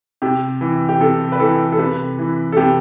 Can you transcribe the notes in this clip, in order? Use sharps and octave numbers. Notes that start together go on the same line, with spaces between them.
C3 G4
E3
G4
C3 A4
B4
E3 A4
A4
C3 B4
E3
A4
C3 G4